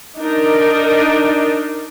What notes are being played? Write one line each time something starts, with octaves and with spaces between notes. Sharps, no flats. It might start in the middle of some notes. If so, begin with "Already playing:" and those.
D4 D#4 A#4